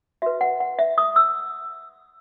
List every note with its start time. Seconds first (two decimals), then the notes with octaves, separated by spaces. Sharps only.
0.22 F#4 B4 E5
0.41 F#5
0.60 F#5
0.79 E5
0.98 D#6
1.16 E6